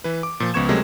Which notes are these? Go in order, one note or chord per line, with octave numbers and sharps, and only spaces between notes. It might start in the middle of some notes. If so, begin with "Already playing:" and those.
E3 B4
D6
A#2 F3
C#2 F3 B3 C#6 G#6 E7
C3 F#3 G#3 A3 A#4